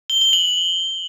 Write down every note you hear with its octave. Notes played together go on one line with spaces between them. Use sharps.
G7
G7
F#7